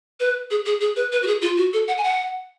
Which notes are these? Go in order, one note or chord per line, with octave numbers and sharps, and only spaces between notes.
B4
G#4
G#4
G#4
B4
B4
F#4
G#4
F4
F#4
A4
F#5
G#5
F#5